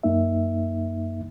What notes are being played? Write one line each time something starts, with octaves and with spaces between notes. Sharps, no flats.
F#2 A#3 D#4 E5